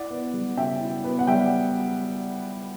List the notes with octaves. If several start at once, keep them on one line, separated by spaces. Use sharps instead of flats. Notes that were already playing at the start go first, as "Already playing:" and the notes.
Already playing: E4 D5 F#5
B3
G3
C#3 E5 G5
E4
B3
F#5
G3 E5 G5